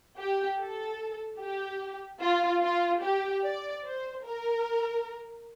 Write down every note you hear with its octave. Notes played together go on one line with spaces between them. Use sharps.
G4
A4
G4
F4
F4
G4
D5
C5
A#4